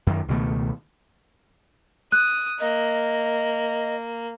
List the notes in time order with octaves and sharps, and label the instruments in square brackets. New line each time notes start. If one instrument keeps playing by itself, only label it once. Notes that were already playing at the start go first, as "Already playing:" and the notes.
[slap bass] F#2 D#3
C#2 B2 D#3 A3
[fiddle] D#6 [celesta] F#6
[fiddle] A#3 [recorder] D#5